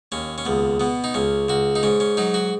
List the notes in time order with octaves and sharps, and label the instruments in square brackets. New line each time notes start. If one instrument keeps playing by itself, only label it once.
[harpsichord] D#2 C#4
C#4
C#2 B3
B2 B3
D#4
C#2 C#4
C#2 F#4
D#4
G#2 C#4
C#4
F#3 D#4
F#4